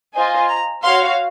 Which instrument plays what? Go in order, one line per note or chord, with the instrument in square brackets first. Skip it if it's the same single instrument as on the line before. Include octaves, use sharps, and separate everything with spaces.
[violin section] F4 C5 D#5 G#5
[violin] A#5
[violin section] F#4 C#5 F5 [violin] C6